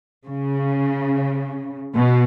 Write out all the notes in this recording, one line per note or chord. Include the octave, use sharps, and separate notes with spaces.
C#3
B2